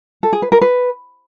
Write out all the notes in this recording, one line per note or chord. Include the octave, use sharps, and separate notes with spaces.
A4
G#4
B4
A#4
B4